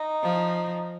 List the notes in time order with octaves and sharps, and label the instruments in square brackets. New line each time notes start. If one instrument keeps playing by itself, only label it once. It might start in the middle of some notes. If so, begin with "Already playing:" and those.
Already playing: [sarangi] D#4
[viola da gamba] F3